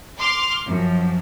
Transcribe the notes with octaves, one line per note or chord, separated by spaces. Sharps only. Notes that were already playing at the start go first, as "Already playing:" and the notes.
C6 D6 F6
F#2 F3